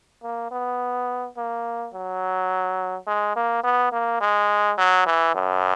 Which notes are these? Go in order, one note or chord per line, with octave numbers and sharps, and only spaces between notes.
A#3
B3
A#3
F#3
G#3
A#3
B3
A#3
G#3
F#3
E3
F#2